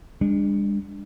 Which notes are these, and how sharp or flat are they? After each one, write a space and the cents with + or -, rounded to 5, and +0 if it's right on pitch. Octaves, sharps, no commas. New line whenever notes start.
G#3 -45 D4 +0